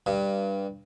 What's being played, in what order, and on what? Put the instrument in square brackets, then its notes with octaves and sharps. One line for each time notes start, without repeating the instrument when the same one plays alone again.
[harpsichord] G2